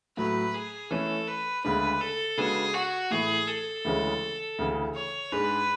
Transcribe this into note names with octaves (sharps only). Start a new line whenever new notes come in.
A2 F#3 A3 B4
G#4
E3 A3 C#4 A4
B4
D2 C#3 G#3 D4 B4
A4
C#3 G#3 B3 D4 F#4 G#4
F#4
A2 E3 A3 E4 G#4
A4
D2 C#3 E3 G#3 C#4
D2 C#3 E3
C#5
G#2 G#3 D4 G#4 B4